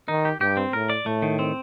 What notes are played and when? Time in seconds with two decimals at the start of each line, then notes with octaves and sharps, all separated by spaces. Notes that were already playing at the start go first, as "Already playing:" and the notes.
0.08 D#3 D#4
0.25 G4
0.41 G2 G4
0.57 C4
0.73 A2 A#4
0.90 D5
1.06 A2 A3
1.22 D#3
1.39 C4